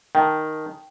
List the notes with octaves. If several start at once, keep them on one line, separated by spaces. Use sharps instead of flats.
D#3 G5 A5